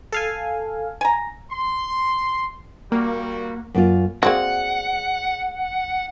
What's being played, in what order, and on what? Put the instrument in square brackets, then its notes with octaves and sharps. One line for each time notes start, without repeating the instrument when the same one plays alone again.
[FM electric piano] A4 F5 G#5
[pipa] G#5 A#5
[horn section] C6
[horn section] G3 F#4 [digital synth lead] A#3
[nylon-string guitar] F#2 A#3 F4
[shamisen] A#3 C4 F#4 [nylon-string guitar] G#4 D5 [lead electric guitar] F#5